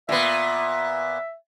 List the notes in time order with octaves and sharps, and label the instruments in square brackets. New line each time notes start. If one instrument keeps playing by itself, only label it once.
[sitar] A#2 B3 [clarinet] E5